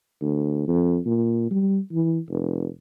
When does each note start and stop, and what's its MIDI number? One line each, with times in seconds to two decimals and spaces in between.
0.21 0.65 38
0.68 0.99 41
1.06 1.46 46
1.50 1.79 55
1.92 2.19 52
2.29 2.67 29